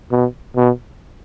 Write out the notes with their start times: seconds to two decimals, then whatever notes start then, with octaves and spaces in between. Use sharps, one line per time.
0.12 B2
0.56 B2